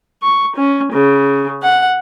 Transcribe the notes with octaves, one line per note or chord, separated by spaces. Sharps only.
C#6
C#4
C#3
F#5